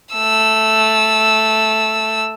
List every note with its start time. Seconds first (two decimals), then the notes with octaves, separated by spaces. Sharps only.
0.13 A3 E6